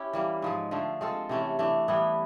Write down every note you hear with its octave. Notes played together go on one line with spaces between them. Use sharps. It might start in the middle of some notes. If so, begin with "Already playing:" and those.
Already playing: C#4 E4 G4
E3 G3 A#3
G#2 F3 G#3
D3 F3 A3
G#3 C4 F4 A4
C3 E3 A3 C#4
E3 A3 D4
E3 G3 B3 E4